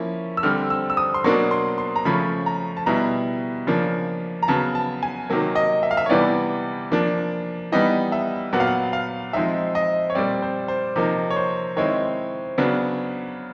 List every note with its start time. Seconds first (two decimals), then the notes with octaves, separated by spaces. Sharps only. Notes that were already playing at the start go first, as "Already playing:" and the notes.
Already playing: F3 A#3 C#4 E4
0.37 E6
0.43 D3 G3 C4 F6
0.70 E6
0.90 E6
0.97 D#6
1.14 C6
1.24 B2 F#3 A#3 D4 C#6
1.51 C6
1.78 C6
1.96 A#5
2.05 C#3 F3 A3 C#4 B5
2.46 A#5
2.77 A5
2.86 B2 G3 B3 E4 A#5
3.67 C#3 F3 A#3 D4
4.43 A#5
4.48 C#3 F#3 B3 A5
4.75 A5
5.03 G#5
5.30 C3 D#3 F#3 A#3
5.56 D#5
5.83 E5
5.91 F5
5.97 E5
6.06 C#5
6.10 C3 E3 G3 B3 D5
6.92 F3 A#3 D4
7.72 E3 G3 B3 D#4 D#5
8.12 E5
8.53 A#2 F#3 B3 F#5
8.60 F5
8.67 F#5
8.93 F5
9.33 F3 G#3 C4 D#4 E5
9.75 D#5
10.10 C#5
10.15 A#2 G3 C4 D5
10.42 C5
10.68 C5
10.96 C3 F3 A#3 D#4
11.30 C#5
11.36 C5
11.76 D#3 G#3 C4 E4 C#5
12.58 C#3 F#3 B3 D4